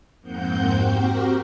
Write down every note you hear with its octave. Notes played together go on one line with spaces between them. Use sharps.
F2 G#2 A#3 C4 F#5 G6
C4 F#4 G4 A#4